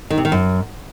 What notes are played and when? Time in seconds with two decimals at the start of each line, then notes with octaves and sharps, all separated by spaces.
0.10 D#3
0.18 C3
0.25 D#3
0.32 F#2